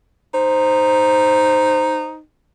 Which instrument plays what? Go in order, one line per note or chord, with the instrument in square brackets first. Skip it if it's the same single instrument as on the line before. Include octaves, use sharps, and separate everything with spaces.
[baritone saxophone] D#4 [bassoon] C5